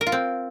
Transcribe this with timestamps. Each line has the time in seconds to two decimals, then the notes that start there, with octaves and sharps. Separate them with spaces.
0.01 A#4
0.07 F4
0.12 C4